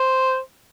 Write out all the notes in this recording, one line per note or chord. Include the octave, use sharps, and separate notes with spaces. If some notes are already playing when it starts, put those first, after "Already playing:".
Already playing: C5